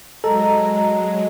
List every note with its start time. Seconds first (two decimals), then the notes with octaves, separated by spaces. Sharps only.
0.24 F#3 G#3 A4 D#5 A#5